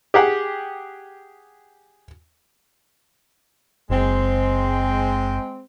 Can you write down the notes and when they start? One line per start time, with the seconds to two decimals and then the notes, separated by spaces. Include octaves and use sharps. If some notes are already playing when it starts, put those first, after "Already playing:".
0.14 G4 G#4 F#5 G5
3.90 F#1 G#3 C4